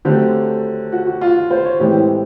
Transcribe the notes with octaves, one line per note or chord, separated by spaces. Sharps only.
D3 F#3 A3 C4 G4
F#4
F#4
F4
C5
C#5
A2 E3 G#3 C4 G4